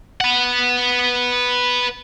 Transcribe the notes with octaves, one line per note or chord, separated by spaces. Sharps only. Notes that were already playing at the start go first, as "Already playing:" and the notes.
B4 F#5